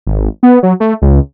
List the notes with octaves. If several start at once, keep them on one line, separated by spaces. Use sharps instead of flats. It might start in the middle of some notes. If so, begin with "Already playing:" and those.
G#1
B3
F#3
A3
C#2